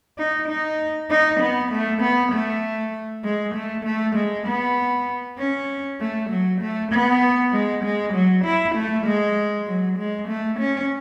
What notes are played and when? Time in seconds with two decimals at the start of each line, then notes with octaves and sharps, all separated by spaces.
0.19 D#4
0.49 D#4
1.11 D#4
1.40 B3
1.72 A3
2.02 B3
2.33 A3
3.25 G#3
3.55 A3
3.85 A3
4.16 G#3
4.48 B3
5.39 C#4
6.01 A3
6.30 F#3
6.61 A3
6.92 B3
7.53 G#3
7.84 G#3
8.14 F#3
8.45 E4
8.75 A3
9.06 G#3
9.67 F#3
9.98 G#3
10.28 A3
10.60 C#4